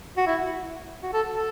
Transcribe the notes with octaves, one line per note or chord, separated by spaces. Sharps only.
F#4
E4
F#4
A4
A4